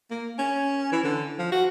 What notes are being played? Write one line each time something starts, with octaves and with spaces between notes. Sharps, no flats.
A#3
C#4
E3
D3
F3
F#4